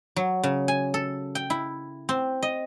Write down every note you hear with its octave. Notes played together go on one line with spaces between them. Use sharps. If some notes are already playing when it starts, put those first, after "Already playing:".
F#3
C#3
G#5
A4
G5
E4
C4
D#5